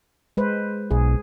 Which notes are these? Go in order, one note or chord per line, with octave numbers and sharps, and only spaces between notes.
G#3 B4 C5
B1 G#4